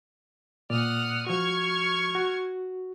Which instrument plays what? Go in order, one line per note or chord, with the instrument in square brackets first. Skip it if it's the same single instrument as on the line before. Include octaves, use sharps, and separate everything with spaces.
[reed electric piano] A#2 D5 [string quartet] F#5 D#6 F6
[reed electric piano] F3 F#4 [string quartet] C#6 F6 G#6
[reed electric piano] F#4